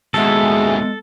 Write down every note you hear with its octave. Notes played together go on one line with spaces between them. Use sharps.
D#2 B2 G#3 G#4 A4 E5